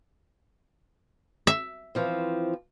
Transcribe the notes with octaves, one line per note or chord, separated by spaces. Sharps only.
E5
E3 F3 C4